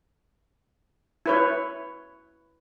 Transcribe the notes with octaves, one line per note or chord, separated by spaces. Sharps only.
E4 B4 C#5